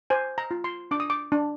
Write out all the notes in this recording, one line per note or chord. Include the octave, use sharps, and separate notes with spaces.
C5 G#5
A#5
F4
C6
D4 D6
D#6
D6
D4